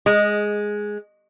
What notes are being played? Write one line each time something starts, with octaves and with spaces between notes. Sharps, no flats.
G#3